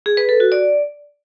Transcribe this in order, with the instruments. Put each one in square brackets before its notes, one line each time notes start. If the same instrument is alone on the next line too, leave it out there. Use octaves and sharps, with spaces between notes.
[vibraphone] G#4
B4
A4
F#4
D5